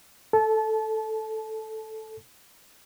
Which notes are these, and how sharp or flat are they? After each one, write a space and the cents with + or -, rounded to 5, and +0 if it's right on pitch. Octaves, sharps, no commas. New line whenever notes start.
A4 +0 A5 -25